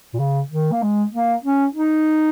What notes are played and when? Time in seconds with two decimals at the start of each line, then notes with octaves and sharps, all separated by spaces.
0.14 A#2
0.19 C#3
0.51 D#3
0.72 A#3
0.82 G#3
1.13 A#3
1.44 C#4
1.75 D#4